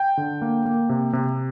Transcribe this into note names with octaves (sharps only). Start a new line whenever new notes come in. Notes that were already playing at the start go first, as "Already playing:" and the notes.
Already playing: G5
D3
A#3
A#3
C3
C3